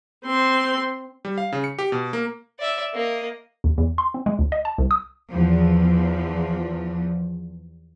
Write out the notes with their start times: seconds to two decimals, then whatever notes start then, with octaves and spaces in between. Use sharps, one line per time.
0.25 C4 C6
1.25 G3
1.38 F5
1.52 C#3
1.64 C#7
1.79 G4
1.92 B2
2.13 A#3
2.59 D5 E5
2.93 A#3 D#5
3.64 D#2
3.78 E2
3.98 C6
4.14 C4
4.26 G#3
4.39 D2
4.52 D#5
4.65 A5
4.78 C2
4.91 D#6
5.31 E2 F3